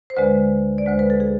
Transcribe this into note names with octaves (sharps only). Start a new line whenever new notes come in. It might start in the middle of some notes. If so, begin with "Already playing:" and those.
C5
D2 D3 G#3 B4
D5
D2 D3 G#3 C5
B4
A4
G#4